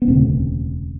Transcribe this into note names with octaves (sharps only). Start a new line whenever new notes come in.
B3
E1 D2 C#3 C4